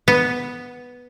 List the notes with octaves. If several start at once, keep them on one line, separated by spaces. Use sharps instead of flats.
B3